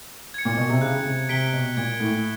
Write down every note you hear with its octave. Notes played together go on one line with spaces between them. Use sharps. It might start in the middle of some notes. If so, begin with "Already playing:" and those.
G#6 C#7
A#2
B2
C3
C#3 F#6
C#3
C3
C3 B6 D7 G7
B2
A#2 G#6
A2